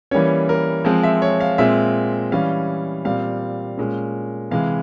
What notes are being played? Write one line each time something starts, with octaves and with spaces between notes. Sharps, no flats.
E3 G3 A#3 C#4 C#5
A#4
F3 G#3 C4
E5
C#5
F5
A#2 G#3 C4 E5
E3 G3 C#4 F5
A#2 G3 C4 F5
A#2 G#3 C#4
C3 E3 G#3 F5